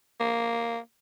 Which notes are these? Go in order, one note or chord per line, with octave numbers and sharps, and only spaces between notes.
A#3